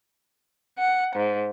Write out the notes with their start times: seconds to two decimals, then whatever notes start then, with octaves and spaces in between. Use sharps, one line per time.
0.79 F#5
1.16 G#2